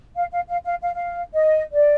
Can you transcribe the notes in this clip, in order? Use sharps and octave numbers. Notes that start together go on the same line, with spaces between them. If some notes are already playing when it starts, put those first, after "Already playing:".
F5
F5
F5
F5
F5
F5
D#5
D5